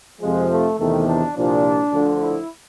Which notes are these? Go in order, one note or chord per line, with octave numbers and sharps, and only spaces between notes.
F2 C3 F3 G#3
A3
E2 C3 D#3 A3
D4
C2 A#2 F3 D4
D2 D3 F3
E4